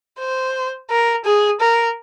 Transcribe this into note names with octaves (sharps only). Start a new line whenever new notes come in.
C5
A#4
G#4
A#4